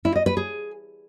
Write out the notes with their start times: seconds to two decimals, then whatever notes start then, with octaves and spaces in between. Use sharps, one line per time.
0.05 E4
0.16 D#5
0.26 B4
0.37 G#4